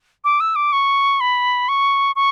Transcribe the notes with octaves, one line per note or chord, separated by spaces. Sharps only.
D6
E6
D6
C#6
B5
C#6
C#6